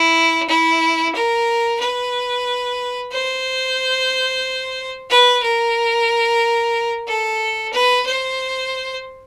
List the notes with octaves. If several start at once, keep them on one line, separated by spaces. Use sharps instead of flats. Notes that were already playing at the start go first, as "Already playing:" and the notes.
Already playing: E4
E4
A#4
B4
C5
B4
A#4
A4
B4
C5